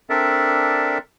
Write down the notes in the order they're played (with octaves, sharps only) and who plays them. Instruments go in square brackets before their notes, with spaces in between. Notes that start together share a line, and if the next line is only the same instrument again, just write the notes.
[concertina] C4 D4 A4 A#4 D5 E5